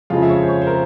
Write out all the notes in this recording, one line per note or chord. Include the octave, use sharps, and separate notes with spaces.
F2 C#3 F3 G#3 F4
E5
C#5
C5
C#5
C5
A#4